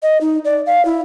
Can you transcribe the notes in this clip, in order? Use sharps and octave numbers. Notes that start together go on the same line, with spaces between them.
D#5
D#4
D5
F5
E4